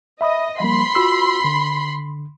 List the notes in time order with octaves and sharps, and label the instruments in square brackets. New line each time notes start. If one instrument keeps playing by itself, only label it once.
[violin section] D#5 [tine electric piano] E5 B5 D#6
[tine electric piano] F3 G3 A#3 [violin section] B5 C6
[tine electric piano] F4 F#4 E6
D3